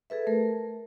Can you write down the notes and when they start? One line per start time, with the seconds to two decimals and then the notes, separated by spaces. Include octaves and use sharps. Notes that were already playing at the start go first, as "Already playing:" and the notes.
0.10 G#4 A4 B4 E5
0.27 A3 A#4